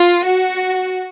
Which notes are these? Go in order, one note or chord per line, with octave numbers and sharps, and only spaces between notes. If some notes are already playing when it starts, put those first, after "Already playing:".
Already playing: F4
F#4